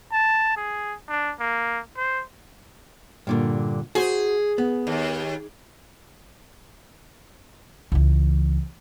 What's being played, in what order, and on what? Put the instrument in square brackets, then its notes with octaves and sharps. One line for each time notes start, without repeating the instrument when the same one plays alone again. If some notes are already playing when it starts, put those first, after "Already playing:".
[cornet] A5
G#4
D4
A#3
C5
[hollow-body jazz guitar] G2 A#2 D3
[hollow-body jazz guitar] F#4 C5 [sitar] G#4
[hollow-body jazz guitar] B3
[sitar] D#2
[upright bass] C#2 E3